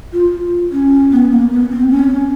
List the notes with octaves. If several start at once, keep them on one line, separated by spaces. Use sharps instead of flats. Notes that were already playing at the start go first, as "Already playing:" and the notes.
F4
C#4
B3
A#3
B3
C4
C#4